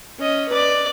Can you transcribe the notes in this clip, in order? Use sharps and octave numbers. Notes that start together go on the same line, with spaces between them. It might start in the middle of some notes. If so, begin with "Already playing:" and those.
C#4 D#5
B4 D5